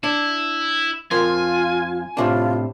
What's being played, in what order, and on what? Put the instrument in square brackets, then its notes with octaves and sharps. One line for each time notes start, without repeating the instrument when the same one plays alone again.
[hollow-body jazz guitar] D4 [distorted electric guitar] E4
[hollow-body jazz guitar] F2 A#4 C5 [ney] F4 [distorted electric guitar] G#5
[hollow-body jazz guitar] A2 C3 D4 [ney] F4